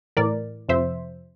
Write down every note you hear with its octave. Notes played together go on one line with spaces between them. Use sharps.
A2 E3 A#4 D5
F2 C3 F3 C5 E5